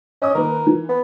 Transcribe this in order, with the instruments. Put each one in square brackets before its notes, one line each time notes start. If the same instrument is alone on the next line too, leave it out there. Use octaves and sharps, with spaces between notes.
[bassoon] C#4 [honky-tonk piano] D#5 D6 D#6
[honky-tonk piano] D#3 A#3 B4 [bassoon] A#4
[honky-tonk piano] E3
[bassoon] B3